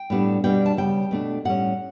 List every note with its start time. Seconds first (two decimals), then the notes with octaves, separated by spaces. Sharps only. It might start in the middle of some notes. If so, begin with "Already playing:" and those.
Already playing: G5
0.10 A2 G3 B3 D4
0.44 B2 G3 B3 D4 G5
0.66 A5
0.77 C#3 G3 B3 G5
1.11 B2 A3 D4
1.45 A2 G3 C#4 F#5